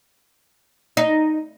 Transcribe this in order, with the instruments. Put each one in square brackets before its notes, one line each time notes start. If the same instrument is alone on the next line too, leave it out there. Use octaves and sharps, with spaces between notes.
[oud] D#4